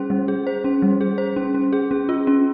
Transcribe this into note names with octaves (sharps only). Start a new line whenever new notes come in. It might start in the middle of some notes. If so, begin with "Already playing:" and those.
Already playing: G3 C#4 G#4 C5
G3
G#4
C5
C#4
G3
G#4
C5
C#4
C#4
G#4
C#4
F4
C#4